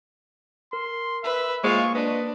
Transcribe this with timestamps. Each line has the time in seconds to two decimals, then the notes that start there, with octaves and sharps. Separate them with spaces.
0.73 A#4 C6
1.24 B4 E5
1.64 G#3 A#3 F4 C5 C#6 D#6
1.95 D4 B4 D#5